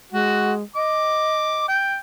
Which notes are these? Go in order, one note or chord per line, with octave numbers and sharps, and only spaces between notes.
G#3 F#4
D#5 D6
G5